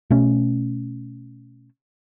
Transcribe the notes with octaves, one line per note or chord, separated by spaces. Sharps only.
B2 A3 C#4